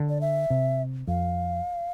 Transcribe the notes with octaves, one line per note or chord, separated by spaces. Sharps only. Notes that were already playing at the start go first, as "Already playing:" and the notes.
Already playing: D3
D5
E5
C3
F2 F5